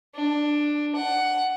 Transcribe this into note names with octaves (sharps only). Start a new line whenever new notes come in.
D4
F#5